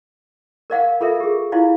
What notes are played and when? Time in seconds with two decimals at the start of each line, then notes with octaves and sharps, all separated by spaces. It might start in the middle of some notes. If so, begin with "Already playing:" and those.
0.70 A#4 D5 F5 F#5
1.01 F4 A4 A#4 E5
1.20 G4 G#4
1.52 E4 F4 D5 F5